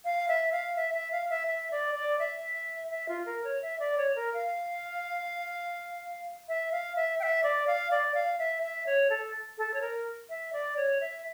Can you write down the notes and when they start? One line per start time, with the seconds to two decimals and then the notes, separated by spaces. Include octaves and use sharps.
0.05 F5
0.28 E5
0.52 F5
0.76 E5
0.94 E5
1.12 F5
1.30 E5
1.47 E5
1.72 D5
1.95 D5
2.19 E5
2.90 E5
3.09 F4
3.26 A#4
3.44 C#5
3.62 E5
3.80 D5
3.98 C#5
4.16 A#4
4.34 F5
6.48 E5
6.72 F5
6.96 E5
7.20 G5
7.23 E5
7.43 D5
7.67 F5
7.91 D5
8.15 F5
8.39 E5
8.63 E5
8.86 C#5
9.10 A4
9.58 A4
9.74 C#5
9.81 A#4
10.29 E5
10.53 D5
10.77 C#5
11.01 E5